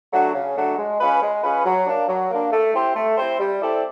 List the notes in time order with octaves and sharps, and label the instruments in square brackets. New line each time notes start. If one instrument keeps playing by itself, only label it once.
[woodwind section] F#3 A3 D4 F#4
C#3
F#3 A3 D4 F#4
G#3
C#4 F4 G#4 B4
G#3
C#4 F4 G#4 B4
F#3
A#3 D4
F#3
A#3 D4
A3
C4 E4 G4 C5
A3
C4 E4 G4 C5
G3
C4 E4 A4 D5